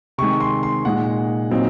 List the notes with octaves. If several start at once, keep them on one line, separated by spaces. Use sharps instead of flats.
C3 D#3 G#3 C#6
C6
C6
A#2 G#3 D#4 F#5
A#2 F#3 C4 D#4